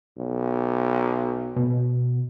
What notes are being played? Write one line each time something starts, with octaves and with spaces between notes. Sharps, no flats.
B1
B2